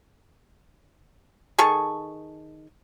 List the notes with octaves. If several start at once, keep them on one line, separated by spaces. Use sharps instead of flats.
D#3 G#4 A4 C#6